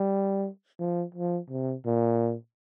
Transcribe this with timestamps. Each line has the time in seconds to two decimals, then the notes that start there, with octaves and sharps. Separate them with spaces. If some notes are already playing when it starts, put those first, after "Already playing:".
Already playing: G3
0.80 F3
1.14 F3
1.50 C3
1.86 A#2